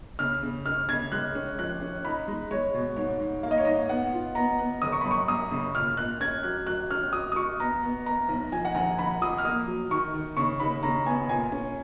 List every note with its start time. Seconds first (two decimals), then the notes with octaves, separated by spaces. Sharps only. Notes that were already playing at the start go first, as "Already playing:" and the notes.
0.19 C#3 F6
0.43 C#3
0.66 C#4 F6
0.89 C#3 G#6
1.12 G#3 F#6
1.35 C#4
1.59 F3 F#6
1.81 C#4
2.05 D#4 B5
2.28 G#3
2.51 G#3 C#5
2.74 B2
2.96 G#2 C#5
3.20 G#2
3.43 A#3 F5
3.51 D#5
3.58 C#5
3.65 G#2 D#5
3.89 B3 F#5
4.12 F4
4.35 B3 A#5
4.59 B3
4.82 F#1 D#6
4.92 C#6
5.01 F#2 B5
5.11 C#6
5.28 F#2 D#6
5.51 C#3
5.75 A#2 F6
5.97 A#2 F#6
6.20 C#4 G#6
6.43 F#3 F#6
6.66 F#3 F#6
6.90 C#4 F6
7.13 F#4 D#6
7.32 D#6
7.36 F#4 C#6
7.60 B3 A#5
7.83 B3
8.06 B3 A#5
8.28 B1
8.52 F3 G#5
8.65 F#5
8.75 A#1 G#5
8.98 A#1 B5
9.21 F3 D#6
9.38 F6
9.44 A#3 D#6
9.68 F#3
9.90 D#3 C#6
10.14 D#3
10.37 C#3 C#6
10.60 D#2 B5
10.83 C#3 A#5
11.06 B3 G#5
11.29 A#2 G#5
11.52 C#4